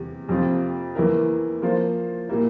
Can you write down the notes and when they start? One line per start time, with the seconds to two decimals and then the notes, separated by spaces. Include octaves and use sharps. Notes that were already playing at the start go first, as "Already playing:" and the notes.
Already playing: E2 C3 G3
0.29 F2 C3 F3 C4 F4
0.95 E2 E3 A#3 E4 A#4
1.62 F3 A#3 F4 C5
2.29 A#2 G3 A#3 E4